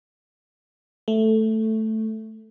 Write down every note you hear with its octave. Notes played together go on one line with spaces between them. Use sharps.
A3